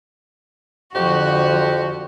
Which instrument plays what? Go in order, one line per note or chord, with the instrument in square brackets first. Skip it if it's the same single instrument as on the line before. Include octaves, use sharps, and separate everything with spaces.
[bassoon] F2 [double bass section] D3 F3 [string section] F#4 [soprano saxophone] G4